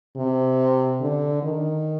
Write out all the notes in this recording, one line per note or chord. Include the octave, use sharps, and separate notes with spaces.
C3
D3
D#3